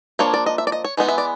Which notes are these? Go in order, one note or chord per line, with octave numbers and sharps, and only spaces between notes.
F3 A#3 D4 C#5
D5
D#5
E5
D5
D#5
C#5
E3 G#3 B3 D#4
E5
D5